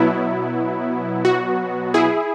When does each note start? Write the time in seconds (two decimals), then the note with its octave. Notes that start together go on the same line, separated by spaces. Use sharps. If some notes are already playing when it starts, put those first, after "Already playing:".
Already playing: B2 F#3 B3 E4
1.25 F#4
1.94 E4 G#4